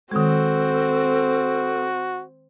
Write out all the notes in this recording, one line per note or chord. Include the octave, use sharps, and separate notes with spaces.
D#3 G#3 C4 F#4 A4